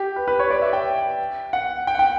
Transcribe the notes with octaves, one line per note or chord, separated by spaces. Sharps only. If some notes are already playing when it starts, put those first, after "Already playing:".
Already playing: G4
B4
B4
C#5
D5
E5
G5
F#5
G5
F#5
G5